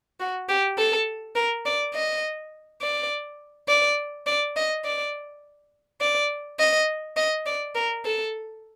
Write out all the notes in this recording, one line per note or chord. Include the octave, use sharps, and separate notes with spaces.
F#4
G4
A4
A#4
D5
D#5
D5
D5
D5
D#5
D5
D5
D#5
D#5
D5
A#4
A4